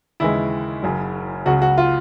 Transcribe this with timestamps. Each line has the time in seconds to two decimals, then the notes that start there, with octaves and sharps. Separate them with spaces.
0.20 D#2 C#3 E3 G#3 E4
0.83 F#1 F#2 C#3 F#3
1.45 C#2 C#3 F#3 F#4
1.62 F#4
1.78 F4